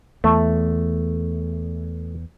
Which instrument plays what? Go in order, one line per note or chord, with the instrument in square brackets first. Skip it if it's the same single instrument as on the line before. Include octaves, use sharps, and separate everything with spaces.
[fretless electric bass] E2 [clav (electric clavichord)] A3